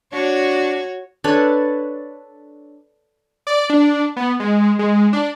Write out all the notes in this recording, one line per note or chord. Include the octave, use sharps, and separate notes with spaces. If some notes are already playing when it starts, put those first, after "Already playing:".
D4 F#4 C#5
D4 A4 B4 C#5
D5
D4
B3
G#3
G#3
D4